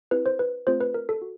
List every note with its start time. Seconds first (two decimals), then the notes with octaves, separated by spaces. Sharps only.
0.11 C4 E4 G4 B4
0.26 C5
0.39 B4
0.67 A3 C4 F4 G#4 C5
0.81 B4
0.94 A#4
1.09 A4
1.22 F#4